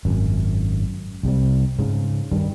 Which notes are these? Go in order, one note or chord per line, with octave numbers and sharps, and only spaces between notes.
G#1 F#2
C2 C3 G3
G#2 C#3
G2 D#3 G3